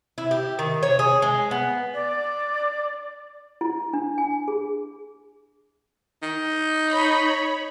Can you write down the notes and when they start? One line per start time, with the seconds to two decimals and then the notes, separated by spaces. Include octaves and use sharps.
0.18 E4
0.31 G4
0.59 D#3
0.83 C#5
0.99 G#4
1.22 G#3
1.51 B3
1.94 D5
3.61 E4
3.93 D4
4.18 G#5
4.48 G#4
6.23 D#4
6.88 C#5 B5